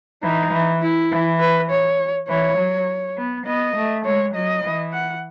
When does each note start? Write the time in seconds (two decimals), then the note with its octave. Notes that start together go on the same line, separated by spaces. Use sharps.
0.23 E3 D#4
0.51 E3
0.81 E4
1.11 E3
1.40 B4
1.70 C#5
2.28 E3 C#5
2.58 F#3
3.17 B3
3.46 B3 D#5
3.76 A3
4.05 G#3 C#5
4.34 F#3 D#5
4.64 E3
4.93 F#5